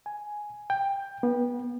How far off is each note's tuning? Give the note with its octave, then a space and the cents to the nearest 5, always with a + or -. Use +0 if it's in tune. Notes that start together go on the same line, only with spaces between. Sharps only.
G#5 +5
G5 +15
B3 -25